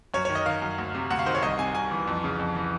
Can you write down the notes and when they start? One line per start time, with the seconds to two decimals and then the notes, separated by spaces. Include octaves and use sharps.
0.14 F#2 C#5
0.25 D#3 C#5
0.35 D#5
0.46 D#3 F5
0.62 F#2
0.78 D2
0.95 C3
1.10 D2 F#5
1.19 F5
1.26 D#3 C5
1.35 C#5
1.42 C2 D#5
1.58 C3 G#5
1.75 C2 G#5
1.91 E3
2.07 F2
2.24 C#3
2.39 F2
2.56 E3